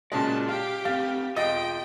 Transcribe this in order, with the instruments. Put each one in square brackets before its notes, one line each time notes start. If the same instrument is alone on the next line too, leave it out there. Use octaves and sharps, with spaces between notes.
[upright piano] A#2 C#3 G#3 [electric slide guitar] F#4 C#5 D5 [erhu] A5
[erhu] G4 [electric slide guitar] F5 [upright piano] F6
[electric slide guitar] A3 C4 [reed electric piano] F5 [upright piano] A6
[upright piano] E1 D#5 A6 [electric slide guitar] F4 [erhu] G5